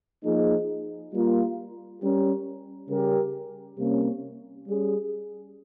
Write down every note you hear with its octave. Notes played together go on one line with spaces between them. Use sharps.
F3 A#3 D#4 G#4
G3 A#3 F4 A#4
G3 C#4 G4 A#4
C#3 G3 C#4 G4 A#4
C3 G3 A#3 C#4
G3 C#4 G#4